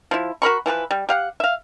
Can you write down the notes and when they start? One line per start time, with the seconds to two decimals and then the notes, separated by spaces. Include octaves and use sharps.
0.11 F3 E4
0.42 F#4 A#4 B5 C#6
0.66 E3 F3 G4 B4
0.91 G3
1.09 G4 F5 F#5
1.40 E5 F5